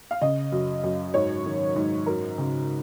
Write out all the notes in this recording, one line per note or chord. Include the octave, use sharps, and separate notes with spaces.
F5
C#3 D#5
F#2
F#2
G#2 C#5
D#3
G#2
F#2 A#4
C#3